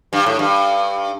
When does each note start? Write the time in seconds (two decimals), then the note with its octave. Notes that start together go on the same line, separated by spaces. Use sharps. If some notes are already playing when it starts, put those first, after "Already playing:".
0.13 G2
0.26 A2
0.39 G2